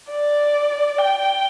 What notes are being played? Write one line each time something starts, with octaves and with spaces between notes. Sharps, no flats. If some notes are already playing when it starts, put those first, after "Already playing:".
D5
G5